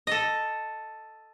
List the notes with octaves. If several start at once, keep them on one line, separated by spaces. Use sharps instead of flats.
A4 D#5